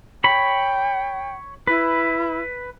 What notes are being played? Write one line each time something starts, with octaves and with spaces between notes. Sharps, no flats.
C#5 G5 B5
E4 B4